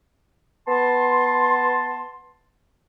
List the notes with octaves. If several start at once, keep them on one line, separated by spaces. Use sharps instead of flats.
B3 A5 C6